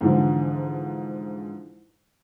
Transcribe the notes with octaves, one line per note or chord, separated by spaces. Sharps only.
G#2 D3 E3 F3